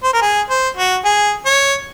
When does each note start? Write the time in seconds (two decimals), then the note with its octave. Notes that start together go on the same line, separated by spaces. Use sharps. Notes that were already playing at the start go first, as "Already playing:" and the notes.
0.04 C5
0.13 A#4
0.22 G#4
0.50 C5
0.76 F#4
1.05 G#4
1.45 C#5